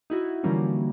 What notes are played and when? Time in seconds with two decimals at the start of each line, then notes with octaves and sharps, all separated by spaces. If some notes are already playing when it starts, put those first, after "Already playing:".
0.10 D#4 E4 F#4
0.44 D3 E3 F3 G3 A#3 C#4